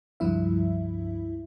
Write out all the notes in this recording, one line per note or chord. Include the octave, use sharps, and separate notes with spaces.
C#2 G2 F3 E4 E5